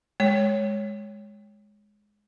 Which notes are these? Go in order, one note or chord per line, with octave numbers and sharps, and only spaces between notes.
G#3 C#5